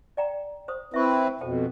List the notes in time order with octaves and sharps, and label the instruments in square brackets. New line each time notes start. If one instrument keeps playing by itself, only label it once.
[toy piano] D5 G5 A#5
C5 D#6
[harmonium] C4 E4 B4 [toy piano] E5 C#6
[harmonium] F2 B2 [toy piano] A4 C5 G5